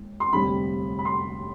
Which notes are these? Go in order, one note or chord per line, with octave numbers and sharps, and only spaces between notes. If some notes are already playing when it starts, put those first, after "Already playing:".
Already playing: E1 D#2
C6
F1 D#2 D3 G3 C4 B5
B5
C6